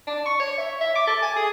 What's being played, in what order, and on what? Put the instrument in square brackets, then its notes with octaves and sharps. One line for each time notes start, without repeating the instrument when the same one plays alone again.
[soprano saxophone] D4
C#6
C#5
E5
E5
D6
A4
G#5
G#4